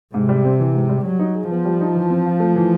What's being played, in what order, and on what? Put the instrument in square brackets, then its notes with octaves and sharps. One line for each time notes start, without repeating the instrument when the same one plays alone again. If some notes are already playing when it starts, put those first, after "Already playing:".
[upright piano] G#2 [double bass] C3
[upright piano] G3
C4
E3
G#2
G3
[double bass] F#3 [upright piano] G3
[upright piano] D#4
G#4
[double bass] F3 [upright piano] B3
[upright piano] G3
D#4
E3
C4
F4
A3
E3